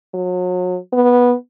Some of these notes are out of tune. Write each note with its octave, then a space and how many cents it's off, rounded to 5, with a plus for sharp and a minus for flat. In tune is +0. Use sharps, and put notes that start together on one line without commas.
F#3 -35
B3 -10